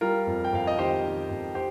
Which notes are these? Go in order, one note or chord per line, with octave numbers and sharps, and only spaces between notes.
G3 F4 A#4
F2
G5
F2 F5
D#5
D#3 G4 C5
D#3
F2
G4 C5